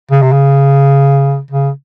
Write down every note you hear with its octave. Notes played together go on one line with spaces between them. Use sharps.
C#3
C3
C#3
C#3